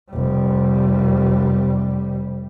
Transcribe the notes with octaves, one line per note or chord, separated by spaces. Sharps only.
F1 G3